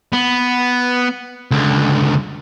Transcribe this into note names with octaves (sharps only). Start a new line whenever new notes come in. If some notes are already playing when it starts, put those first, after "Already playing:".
B3
C#2 D3